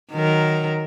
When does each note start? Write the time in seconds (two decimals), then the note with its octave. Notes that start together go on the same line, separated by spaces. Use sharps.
0.12 D#3 F#3 A#4